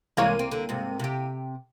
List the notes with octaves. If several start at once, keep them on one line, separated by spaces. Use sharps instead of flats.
C2 E3 G#3 A#3 C#5 D#7
C4
D3
G#2 C3
C3 G4